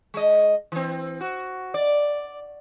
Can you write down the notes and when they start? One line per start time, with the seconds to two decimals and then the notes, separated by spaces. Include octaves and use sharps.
0.14 G#3 D#5
0.72 E3 C4
1.21 F#4
1.74 D5